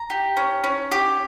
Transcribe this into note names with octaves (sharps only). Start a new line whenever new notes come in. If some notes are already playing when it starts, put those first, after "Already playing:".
Already playing: A#5
G4
C#4
C#4
G4